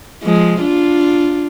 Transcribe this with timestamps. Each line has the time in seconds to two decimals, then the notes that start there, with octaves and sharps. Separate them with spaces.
0.23 F3 G#3
0.61 D4 F4